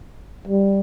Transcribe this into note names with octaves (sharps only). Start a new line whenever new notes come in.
G3